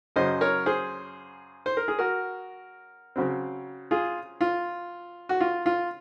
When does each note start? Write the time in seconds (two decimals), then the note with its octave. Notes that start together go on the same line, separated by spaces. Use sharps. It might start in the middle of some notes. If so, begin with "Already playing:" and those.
0.16 F#2 C#3 F#3 C5 D#5
0.41 A#4 C#5
0.66 G#4 C5
1.66 C5
1.77 A#4
1.88 G#4
1.99 F#4 A#4
3.16 C#3 F#3 C4
3.91 F4 G#4
4.41 F4
5.29 F#4
5.41 F4
5.66 F4